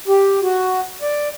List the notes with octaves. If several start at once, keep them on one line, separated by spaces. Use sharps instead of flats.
G4
F#4
D5